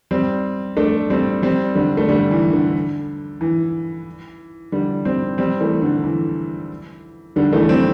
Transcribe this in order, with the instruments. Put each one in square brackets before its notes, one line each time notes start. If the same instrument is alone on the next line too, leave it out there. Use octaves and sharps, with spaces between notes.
[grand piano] G3 C4
A3 D4
G3 C4
G3 C4
D3 G3
A3
D3 G3
E3
D3
E3
D3 G3
G3 C4
G3 C4
E3 A3
D3
E3
D3 G3
E3 A3
G3 C4